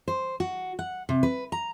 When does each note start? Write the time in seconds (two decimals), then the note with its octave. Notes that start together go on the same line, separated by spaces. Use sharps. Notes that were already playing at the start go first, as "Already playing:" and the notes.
0.08 C5
0.40 F#4
0.79 F#5
1.09 C3
1.23 B4
1.52 A#5